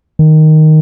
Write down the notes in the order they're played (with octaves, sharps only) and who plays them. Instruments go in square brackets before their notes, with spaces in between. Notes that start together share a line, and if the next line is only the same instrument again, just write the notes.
[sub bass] D#3